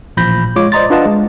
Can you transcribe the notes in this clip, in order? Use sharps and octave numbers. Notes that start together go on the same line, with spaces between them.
A1 A#2 F3 B5 G6 A#6
G#3 F4 C#5 D6
C5 D5 D#5 A#5 C6 A6
D4 F4 B4 D#5 F#5 A5
G#3